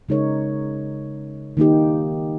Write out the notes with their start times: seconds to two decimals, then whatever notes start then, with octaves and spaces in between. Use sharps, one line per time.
0.09 C#3 G#3 D#4 A#4 C#5
1.57 D#3 A#3 D#4 G4